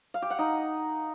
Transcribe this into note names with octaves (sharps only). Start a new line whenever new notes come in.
F5
G4
F#5
D#4